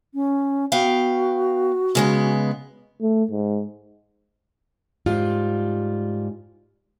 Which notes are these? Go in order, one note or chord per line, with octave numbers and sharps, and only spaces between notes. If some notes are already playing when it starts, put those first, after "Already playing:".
C#4
B3 F#4 F5 G5
C#3 G#3 B3
A3
G#2
G#2 G3 F4